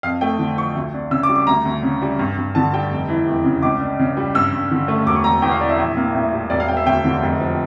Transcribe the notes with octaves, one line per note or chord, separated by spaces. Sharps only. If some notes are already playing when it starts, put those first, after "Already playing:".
F2 F5
A3 G5
D3
F3 C#6
D2
D4
C#3 E6
D6
G3
D6
D2 A#5
D2
C#3
G3
G2
G2
D3 A5
G3 G5
F1
E3
E2
C#3
C#2 D6
D4
C#3
G3
G2 E6
G2
D3
A3
E1 D6
C#6
E1 A#5
E2 G5
F5
E3 D5
E5
A#1
A#3
A2
G3
E1 D5
F5
E1 G5
E5
D2 G5
D3
F1
F3